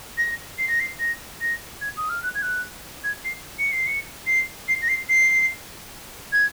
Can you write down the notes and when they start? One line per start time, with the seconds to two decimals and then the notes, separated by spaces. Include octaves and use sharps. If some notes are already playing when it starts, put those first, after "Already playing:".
0.18 A#6
0.58 C7
0.68 A#6
0.80 C7
0.99 A#6
1.41 A#6
1.81 G#6
1.97 D#6
2.09 F6
2.23 F#6
2.35 G#6
2.42 F#6
3.04 G#6
3.25 C7
3.59 C#7
3.72 C7
3.87 C#7
4.27 C7
4.68 C7
4.82 A#6
4.89 C7
5.09 C7
6.33 G#6